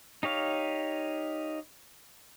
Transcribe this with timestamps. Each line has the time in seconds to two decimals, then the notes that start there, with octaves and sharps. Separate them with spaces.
0.23 D#4 G4 C#5 F5